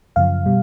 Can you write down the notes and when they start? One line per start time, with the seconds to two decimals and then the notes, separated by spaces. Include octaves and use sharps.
0.16 F#2 C#3 F3 F5
0.46 B2 G3